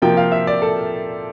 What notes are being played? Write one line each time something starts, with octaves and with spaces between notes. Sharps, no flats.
C3 F3 A#3 G5
F5
E5
D5
A4